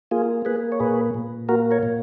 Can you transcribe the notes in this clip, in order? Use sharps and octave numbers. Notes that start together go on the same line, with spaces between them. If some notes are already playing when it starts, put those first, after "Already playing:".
A#3 F4 G#4
A#3 G#4 B4
C#5
A#2 G#4 B4
A#2
A#3 F#4 A#4
A#4 C#5
A#2